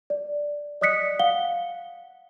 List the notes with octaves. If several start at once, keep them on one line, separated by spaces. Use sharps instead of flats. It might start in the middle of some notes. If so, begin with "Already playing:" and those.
D5
D5 D#5 D#6 F#6 B6 C#7
F5 F#5 G7